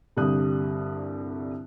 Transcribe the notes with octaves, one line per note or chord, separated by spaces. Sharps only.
C2 G2 D3 G4 D#6 F#6